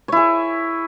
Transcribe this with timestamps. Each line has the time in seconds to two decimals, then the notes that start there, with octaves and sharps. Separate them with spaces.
0.08 C#5
0.12 E4
0.16 G#4